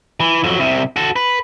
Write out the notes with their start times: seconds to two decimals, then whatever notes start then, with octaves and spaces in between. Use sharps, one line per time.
0.21 E3
0.44 F2 F#3
0.59 C2 C3
0.96 F#4 A4
1.16 B4